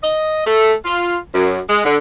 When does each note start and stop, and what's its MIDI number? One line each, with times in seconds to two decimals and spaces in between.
0.02 0.44 75
0.45 0.73 57
0.84 1.16 65
1.34 1.59 42
1.68 1.82 56
1.85 1.97 50